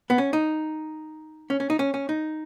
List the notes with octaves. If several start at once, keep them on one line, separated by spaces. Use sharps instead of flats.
B3
C#4
D#4
C#4
C#4
D#4
C#4
C#4
D#4